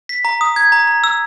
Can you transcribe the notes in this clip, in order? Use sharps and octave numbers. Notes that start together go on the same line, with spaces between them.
B6
A#5
D#6
G#6
A#5
A#5
E6